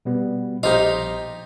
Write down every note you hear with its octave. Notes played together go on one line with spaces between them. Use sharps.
B2 G3 B3
A#1 D#4 F4 G4 C5 D#5